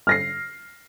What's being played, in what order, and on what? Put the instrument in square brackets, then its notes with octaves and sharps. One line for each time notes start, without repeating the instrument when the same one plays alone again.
[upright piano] F6 A#6 C7